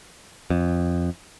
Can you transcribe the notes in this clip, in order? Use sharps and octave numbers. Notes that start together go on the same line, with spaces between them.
F2